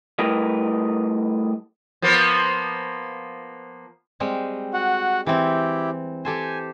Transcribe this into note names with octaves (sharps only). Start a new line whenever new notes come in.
G3 A3 E4 A#4 B4 D#5
F3 A#3 B3
G3 G#3 C4
F#4 F#5
E3 C4 E4 G4
G4 A4 C5 G#5